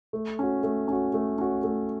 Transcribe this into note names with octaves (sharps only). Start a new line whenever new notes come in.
A3
C#4 F#4
A3
C#4 F#4
A3
C#4 F#4
A3